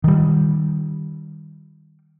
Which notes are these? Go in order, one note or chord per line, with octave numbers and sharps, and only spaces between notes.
D#3 G3